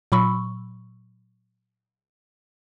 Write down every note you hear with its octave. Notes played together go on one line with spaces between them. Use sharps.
A#2 F#3 B5 C#6 E6